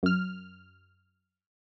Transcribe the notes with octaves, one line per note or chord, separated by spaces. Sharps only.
F#2 F6